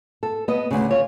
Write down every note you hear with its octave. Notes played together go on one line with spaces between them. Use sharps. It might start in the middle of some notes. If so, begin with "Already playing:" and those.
A4
B3 D#5
D2 C#3
F4 C#5